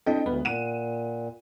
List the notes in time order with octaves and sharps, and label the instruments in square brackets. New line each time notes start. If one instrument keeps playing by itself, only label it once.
[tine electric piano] C4 D4 E4 [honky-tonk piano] A4 D#5 G5
[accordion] D2 [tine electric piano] G#3 B4 [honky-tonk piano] B3
[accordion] A#2 [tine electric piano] F#5 [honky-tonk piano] D#7 E7